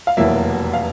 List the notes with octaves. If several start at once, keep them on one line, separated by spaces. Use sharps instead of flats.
F5
F1 E2 B2 F#3 A#3 E5
F5